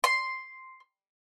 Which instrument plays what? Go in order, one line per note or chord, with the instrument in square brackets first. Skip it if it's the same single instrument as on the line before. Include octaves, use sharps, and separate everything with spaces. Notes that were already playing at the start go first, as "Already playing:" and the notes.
[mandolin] C6